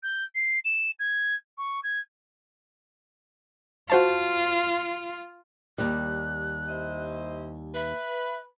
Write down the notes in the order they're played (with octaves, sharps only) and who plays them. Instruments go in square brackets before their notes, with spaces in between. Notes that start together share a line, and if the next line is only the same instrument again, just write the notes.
[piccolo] G6
C7
E7
G#6
C#6
G#6
[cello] F4 [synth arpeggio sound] F#4 C5 A5
[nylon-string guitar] D#2 G3 [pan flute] F#6
[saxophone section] E4 C5 D#5
[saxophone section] B4 [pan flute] E5